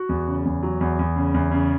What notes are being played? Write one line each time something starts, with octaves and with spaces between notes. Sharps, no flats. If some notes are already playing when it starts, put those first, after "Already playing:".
Already playing: F#4
E2
C#3
E2
F#3
E2
E2
C#3
E2
C#3